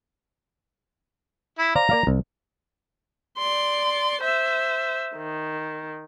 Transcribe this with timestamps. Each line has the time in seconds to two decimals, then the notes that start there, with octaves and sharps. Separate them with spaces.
1.59 E4
1.75 C5 D5 F5 A#5
1.90 A#3 D5 F5
2.07 C2
3.38 D5 C6
4.21 C5 E5
5.16 D#3